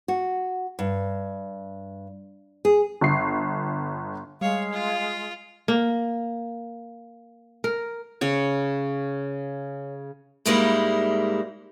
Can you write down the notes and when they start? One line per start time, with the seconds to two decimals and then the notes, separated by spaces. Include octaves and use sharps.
0.08 F#4
0.79 G2
2.65 G#4
3.01 G1 C7
4.41 G3 G#3 C#5 F5
4.73 F4
5.68 A#3
7.64 A#4
8.21 C#3 C#5
10.46 G#2 G3 G#3 A#3 D#4 E4